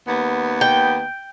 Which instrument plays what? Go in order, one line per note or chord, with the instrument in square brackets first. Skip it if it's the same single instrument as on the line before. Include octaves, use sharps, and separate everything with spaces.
[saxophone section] D#2 B3
[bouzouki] G5